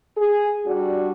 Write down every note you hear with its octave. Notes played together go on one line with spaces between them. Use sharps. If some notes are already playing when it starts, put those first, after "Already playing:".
G#4
G3 D4 F#4